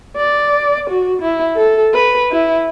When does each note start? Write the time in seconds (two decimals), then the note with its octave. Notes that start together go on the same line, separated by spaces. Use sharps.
0.17 D5
0.90 F#4
1.22 E4
1.57 A4
1.94 B4
2.32 E4